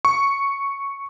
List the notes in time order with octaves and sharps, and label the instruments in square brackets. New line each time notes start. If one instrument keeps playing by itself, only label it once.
[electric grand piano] C#6